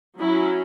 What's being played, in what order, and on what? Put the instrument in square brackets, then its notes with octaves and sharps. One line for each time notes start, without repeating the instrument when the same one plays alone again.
[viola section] F#3 C#4 E4